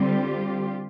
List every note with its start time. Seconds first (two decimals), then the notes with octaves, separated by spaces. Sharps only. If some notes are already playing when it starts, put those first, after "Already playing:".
Already playing: D3 G3 C4 F4 G4